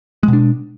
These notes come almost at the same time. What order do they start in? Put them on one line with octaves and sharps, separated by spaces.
G#3 B2 D4